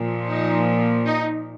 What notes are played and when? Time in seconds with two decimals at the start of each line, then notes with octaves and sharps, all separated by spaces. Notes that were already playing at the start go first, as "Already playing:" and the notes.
Already playing: A#2 F3
0.29 D#4
1.06 D#4